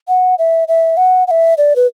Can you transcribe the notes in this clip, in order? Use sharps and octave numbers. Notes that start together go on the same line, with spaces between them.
F#5
E5
E5
F#5
F#5
E5
D5
B4